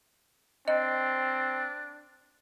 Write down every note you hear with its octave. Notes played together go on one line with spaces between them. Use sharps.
C4 D4 D#5